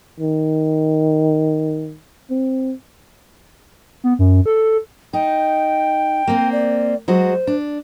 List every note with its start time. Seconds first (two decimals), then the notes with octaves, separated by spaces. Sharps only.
0.20 D#3
2.30 C4
4.04 B3
4.19 F#2
4.46 A4
5.13 D#4 G5
6.27 A#3 C4
6.52 D5
7.08 F#3 G#3 F#4 C5
7.47 D4